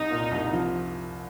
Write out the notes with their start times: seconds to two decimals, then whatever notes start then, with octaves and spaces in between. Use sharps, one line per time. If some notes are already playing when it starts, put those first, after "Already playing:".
Already playing: C2 D#4
0.10 A#2
0.31 C2
0.53 F3